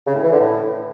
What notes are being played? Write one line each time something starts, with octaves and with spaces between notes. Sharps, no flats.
C#3
A2
E3
D3
A2